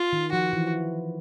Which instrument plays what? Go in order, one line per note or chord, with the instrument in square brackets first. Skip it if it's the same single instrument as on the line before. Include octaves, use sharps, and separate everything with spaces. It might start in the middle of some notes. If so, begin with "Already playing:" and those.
Already playing: [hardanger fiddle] F4
[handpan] D#3
[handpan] F3 [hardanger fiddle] F#4
[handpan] E3